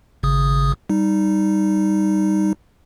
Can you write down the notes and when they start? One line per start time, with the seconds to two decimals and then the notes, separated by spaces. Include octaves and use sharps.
0.23 G#1 C#3 D#6
0.90 G3 D#4